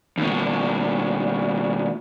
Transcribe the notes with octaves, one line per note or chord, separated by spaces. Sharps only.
D#2 B2